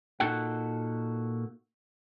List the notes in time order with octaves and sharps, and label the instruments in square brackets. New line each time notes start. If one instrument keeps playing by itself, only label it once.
[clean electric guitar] A#2 D#4 F#4 A4 F#5